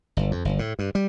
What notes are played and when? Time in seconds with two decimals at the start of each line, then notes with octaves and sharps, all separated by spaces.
0.17 G1
0.31 F2
0.45 G1
0.59 A2
0.79 G2
0.95 G3